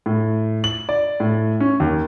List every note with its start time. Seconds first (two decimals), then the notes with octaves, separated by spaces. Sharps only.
0.06 A2
0.64 F#7
0.89 D5
1.20 A2
1.60 C#4
1.80 D#2